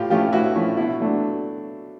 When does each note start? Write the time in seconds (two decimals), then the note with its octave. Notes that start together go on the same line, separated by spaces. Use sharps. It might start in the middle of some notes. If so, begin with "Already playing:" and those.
Already playing: A2 F4 G4
0.10 F3 A3 C#4 E4 F4 G4
0.33 A2 E4 F#4
0.56 F3 A3 C#4 E4
0.77 B2 E4
1.00 F#3 A3 D4